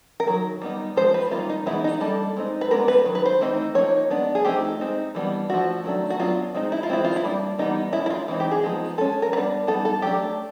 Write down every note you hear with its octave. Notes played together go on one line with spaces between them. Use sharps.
A#4
D#3 F#3
G3 B3 D#4
F3 G#3 C5
B4
D#3 G3 A#3 D#4 F4
D#4
E3 G#3 B3 D#4 E4
D#4
G3 A#3 D4 A4
G#3 C4 D#4
B4
G#3 B3 D4 A#4
B4
D#3 F#3
B4
C5
E3 A3 C4 D#4
F3 A#3 D#4 C#5
G#3 B3 D4
G#4
F3 A3 C4 D#4 G4
G#3 C4 D#4
E3 G3 B3 D4
F3 A3 D4 F#4
D#3 F#3 A3 D4
F#4
F#3 B3 D4 F4
G#3 C4 D#4
E4
F4
E3 G#3 C4 E4
F4
E4
G3 A#3 D4
E3 G3 B3 D#4
G#3 C#4 E4
E4
F4
E3 G#3 C4 D#4
G4
G#4
F3 G#3 B3 D#4
G#3 C#4 A4
A#4
G3 B3 D4 B4
G3 B3 D#4 A4
A4
F#3 A3 D4 G4